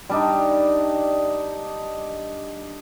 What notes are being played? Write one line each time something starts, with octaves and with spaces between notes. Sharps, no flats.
G3 D4 D#4